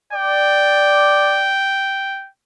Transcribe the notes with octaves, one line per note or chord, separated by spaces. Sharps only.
D5 G5